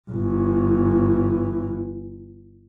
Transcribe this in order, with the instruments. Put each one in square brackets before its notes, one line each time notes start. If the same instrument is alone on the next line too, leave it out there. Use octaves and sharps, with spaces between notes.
[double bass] G1 E3